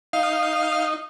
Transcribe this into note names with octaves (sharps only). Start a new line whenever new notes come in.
D#4 F5